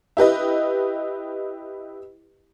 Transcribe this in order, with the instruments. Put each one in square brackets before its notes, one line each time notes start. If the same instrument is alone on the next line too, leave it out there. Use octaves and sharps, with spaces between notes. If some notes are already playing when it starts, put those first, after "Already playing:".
[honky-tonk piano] E4 G4 B4 D#5